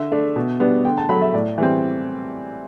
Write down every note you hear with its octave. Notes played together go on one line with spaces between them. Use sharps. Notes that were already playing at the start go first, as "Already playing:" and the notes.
Already playing: D3 E5
A3 D4
B2
G3 B3 D4
D3 G5
A5
F#3 A3 B5
E5
A2 D5
E3 G3 C4